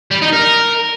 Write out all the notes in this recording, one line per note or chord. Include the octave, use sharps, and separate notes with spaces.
G3
D#4
A#4